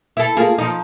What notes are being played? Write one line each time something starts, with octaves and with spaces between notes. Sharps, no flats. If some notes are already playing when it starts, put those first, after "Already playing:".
E4 A4
A#3 F4 G#4
F3 D#4